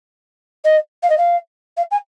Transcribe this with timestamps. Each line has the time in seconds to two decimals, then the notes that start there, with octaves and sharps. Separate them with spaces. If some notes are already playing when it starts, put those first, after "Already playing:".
0.64 D#5
1.03 F5
1.09 D#5
1.17 F5
1.77 F5
1.90 G#5